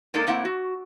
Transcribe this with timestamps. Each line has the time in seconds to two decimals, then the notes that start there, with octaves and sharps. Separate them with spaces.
0.14 G#2 A#3 D4 D#4 A4 A#4
0.27 A2 A#3 C4 E4 F#5
0.45 F#4